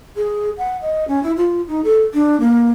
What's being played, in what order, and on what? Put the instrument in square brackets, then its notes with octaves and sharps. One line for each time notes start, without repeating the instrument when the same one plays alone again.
[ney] G#4
F#5
D#5
C#4
E4
F4
D#4
A4
D4
A#3